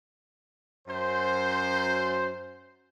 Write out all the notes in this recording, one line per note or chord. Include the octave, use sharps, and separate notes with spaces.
F#2 C5